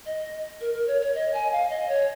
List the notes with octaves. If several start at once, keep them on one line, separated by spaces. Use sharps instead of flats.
D#5
A#4
A#4
C#5
C#5
D#5
G#5
F5
D#5
C#5